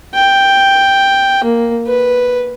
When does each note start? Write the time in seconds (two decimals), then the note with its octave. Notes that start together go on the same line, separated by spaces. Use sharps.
0.15 G5
1.44 A#3
1.86 B4